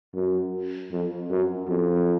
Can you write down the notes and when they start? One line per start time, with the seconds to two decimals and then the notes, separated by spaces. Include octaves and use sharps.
0.15 F#2
0.92 F2
1.30 F#2
1.69 F2